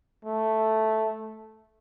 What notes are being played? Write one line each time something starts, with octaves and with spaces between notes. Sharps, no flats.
A3